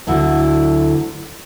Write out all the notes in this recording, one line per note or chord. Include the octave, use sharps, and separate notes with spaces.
D2 D3 F#3 E4